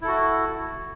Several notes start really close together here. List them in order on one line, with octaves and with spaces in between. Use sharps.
E4 A4 F#4